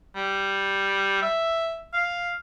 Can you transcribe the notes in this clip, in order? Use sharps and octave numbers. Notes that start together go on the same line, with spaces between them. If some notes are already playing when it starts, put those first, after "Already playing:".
G3
E5
F5